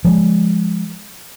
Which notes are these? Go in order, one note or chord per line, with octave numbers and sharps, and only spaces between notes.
F3 G#3